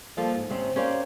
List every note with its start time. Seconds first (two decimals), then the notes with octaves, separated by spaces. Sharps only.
0.17 F3 G3 A#3 F4 A4
0.34 G#2
0.50 D2 C3 C4 C#4
0.76 C#4 G4 A#4 C5 D5 F5